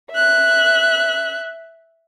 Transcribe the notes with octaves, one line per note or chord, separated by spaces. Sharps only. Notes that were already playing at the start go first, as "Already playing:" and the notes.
E5 F#6